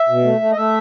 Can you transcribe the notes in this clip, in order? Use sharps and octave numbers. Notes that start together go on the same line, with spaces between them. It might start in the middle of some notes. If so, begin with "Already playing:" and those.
Already playing: E5
B2
A3
A3
D#5
A3 E5